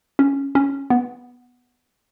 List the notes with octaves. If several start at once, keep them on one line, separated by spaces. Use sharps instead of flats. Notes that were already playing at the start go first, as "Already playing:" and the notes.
C#4
C#4
B3